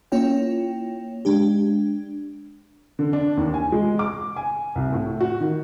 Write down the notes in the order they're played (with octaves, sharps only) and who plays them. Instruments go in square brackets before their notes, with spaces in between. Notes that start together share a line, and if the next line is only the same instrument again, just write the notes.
[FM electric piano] A#3 C#4 E4 F4 C#5 G5
G#3 D4 G4
[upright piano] D3
D4
D#2
G#5
G#3
D6
G#5
C2
A2
F#4
D#3